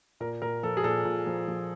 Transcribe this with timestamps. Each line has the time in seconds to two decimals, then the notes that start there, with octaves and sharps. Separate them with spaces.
0.20 A#2 A#4
0.42 A#2 A#4
0.63 F3 A4
0.77 G#4
0.84 A#2 A4
1.05 A#2
1.26 F3
1.48 F3